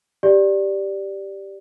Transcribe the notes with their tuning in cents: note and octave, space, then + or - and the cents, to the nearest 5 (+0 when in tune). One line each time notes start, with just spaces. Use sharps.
G4 +0 D5 +0